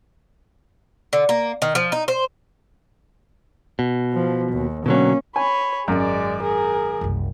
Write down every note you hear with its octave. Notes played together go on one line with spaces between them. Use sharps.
D3
A#3
D#3
F3
D#4
C5
B2
F3
D#2
B2 D3 F#3 A#3 C#4
C#5 G#5 B5
G#1 F#2 D#3 G#3 D5
G#4 A#4
F#1 C2